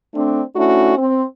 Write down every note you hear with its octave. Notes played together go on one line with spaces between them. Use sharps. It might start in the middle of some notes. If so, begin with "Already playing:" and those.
A3 C4 D4
A3 C#4 D4 E4 F#4
C4